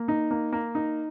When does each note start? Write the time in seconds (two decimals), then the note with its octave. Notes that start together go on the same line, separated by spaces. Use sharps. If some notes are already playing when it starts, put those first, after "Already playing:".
Already playing: A#3
0.08 D#4
0.31 A#3
0.52 A#3
0.75 D#4